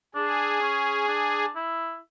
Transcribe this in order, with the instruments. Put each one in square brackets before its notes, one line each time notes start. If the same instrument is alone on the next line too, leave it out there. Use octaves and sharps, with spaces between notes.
[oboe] D4 [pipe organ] G#4
[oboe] C#4
D4
E4